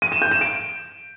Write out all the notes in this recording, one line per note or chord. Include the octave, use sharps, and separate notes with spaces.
D#7
E7
G6
E7
D7